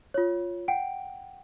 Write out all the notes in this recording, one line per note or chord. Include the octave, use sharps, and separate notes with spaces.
F4 C#5
F#5 G5 D7